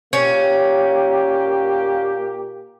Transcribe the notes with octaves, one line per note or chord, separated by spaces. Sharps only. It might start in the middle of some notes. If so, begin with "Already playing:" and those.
A#2 A#3 C#4 G4